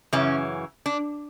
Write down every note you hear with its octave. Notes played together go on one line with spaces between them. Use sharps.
F#2 C#3 E3 C#4
D4